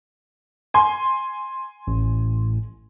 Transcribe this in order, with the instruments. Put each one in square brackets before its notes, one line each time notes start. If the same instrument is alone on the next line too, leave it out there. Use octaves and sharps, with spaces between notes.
[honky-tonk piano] G#5 C6
[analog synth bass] A1